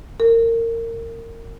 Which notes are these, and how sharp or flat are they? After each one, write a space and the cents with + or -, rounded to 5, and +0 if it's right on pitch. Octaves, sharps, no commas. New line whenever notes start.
A#4 -25